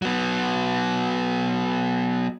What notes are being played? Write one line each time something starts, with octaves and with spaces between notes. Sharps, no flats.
F#3 B3